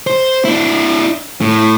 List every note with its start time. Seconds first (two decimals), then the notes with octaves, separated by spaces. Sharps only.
0.07 C5
0.45 D4 E4
1.41 A2